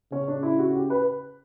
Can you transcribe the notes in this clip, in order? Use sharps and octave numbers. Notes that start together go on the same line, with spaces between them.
C#3 C#4
D4
E4
F#4
G4
B4